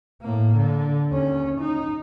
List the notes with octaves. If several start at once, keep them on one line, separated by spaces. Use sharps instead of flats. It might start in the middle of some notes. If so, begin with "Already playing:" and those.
A2 A#3
D3
D#2 C#4
D#4